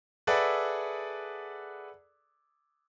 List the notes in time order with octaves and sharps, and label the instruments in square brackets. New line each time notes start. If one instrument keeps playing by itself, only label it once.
[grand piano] G#4 A4 B4 D5 E5 F#5